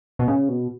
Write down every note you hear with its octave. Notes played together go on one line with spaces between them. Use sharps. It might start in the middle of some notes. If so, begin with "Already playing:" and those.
B2
C#3
B2